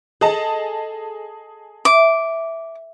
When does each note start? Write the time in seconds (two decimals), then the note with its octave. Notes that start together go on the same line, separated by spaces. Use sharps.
0.21 G#4 A4 D#5 A5
1.85 E5 D6